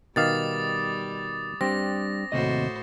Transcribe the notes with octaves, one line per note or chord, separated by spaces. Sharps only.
B2 D#3 G3 F5 D6 D#6 A6
G3 C4 D4 G4 A#6
D#2 A2 C3 F#4 C5 D#5